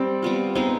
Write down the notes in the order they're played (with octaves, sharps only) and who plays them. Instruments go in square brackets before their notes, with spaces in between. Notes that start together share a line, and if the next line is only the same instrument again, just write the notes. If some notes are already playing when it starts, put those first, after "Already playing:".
Already playing: [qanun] G3 [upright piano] C4
[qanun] G3 B3 F4
[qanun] G#3 B3 D#4 [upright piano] C4